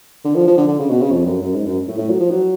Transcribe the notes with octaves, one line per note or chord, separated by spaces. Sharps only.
D3
F3
F3
D3
D3
C#3
B2
C#3
F2
F#2
F#2
G#2
F#2
A2
A2
F#3
F3
F#3